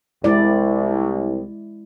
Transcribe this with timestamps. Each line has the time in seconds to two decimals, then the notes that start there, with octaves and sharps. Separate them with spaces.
0.24 C2 G#3 E4 D5